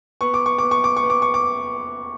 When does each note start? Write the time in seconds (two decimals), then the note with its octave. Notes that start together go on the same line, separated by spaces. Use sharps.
0.21 B3 C#6
0.34 D6
0.46 C#6
0.58 B3 D6
0.71 C#6
0.84 D6
0.97 C#6
1.03 B3
1.10 D6
1.22 C#6
1.34 D6